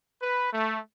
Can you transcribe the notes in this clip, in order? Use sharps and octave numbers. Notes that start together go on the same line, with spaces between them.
B4
A3